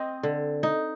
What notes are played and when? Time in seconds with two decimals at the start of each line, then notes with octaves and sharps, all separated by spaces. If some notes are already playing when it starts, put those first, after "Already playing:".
Already playing: C4 D#5
0.23 D3
0.63 D#4